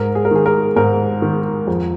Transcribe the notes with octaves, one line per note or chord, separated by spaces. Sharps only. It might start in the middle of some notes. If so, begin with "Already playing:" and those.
Already playing: G#2 A#4
G#4
A#4
D#3 G#4
A#4
G#2 A#4
D#3
F2